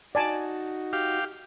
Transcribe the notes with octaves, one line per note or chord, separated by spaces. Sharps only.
D#4 F#4 D5 G#5 A5
G4 F5